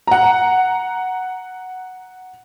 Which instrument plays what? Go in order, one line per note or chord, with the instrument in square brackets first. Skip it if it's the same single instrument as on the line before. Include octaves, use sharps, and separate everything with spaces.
[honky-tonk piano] F#5 A#5